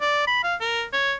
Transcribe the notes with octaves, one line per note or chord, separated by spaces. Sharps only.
D5
B5
F5
A#4
C#5